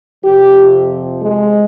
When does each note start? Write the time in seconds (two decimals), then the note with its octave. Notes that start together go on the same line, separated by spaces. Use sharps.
0.24 F2 C3 F3 G4
1.22 G#3